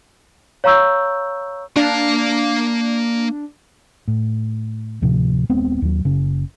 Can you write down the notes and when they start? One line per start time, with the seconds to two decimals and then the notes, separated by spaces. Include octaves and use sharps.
0.64 C#5 F5 A#5 C#6 E6 G6
1.76 A#3 D4 F5
4.08 A2
5.01 D2 A2 C3 F3
5.49 D#1 G#3 B3 C4
5.82 D#2 F#3
6.05 F#1 C#3 C#4